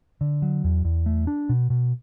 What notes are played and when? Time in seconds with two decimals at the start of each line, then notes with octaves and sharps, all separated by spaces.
0.21 D3
0.42 F#3
0.64 E2
0.85 E2
1.06 A3
1.27 D4
1.49 B2
1.70 B2